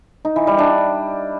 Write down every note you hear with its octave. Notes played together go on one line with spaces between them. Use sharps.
D#4
E3
G3
D4